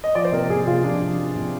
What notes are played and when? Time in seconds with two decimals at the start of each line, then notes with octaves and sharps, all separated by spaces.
0.04 D#5
0.15 F3 D5
0.25 C5
0.32 C3 A#4
0.50 C3 G#4
0.67 C3 F4
0.84 F3 D4
1.02 F3
1.19 F3
1.36 C3